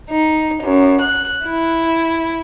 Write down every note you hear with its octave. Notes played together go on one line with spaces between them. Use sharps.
D#4
F#2
F#6
E4